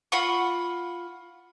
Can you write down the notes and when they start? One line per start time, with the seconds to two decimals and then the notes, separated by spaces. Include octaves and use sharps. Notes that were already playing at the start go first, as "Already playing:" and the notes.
0.12 F4 F#5 B5 C#6